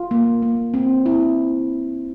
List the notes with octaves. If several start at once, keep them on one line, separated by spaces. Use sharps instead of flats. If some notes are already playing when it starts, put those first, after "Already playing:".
Already playing: F4
A#3
A#3
C4
E4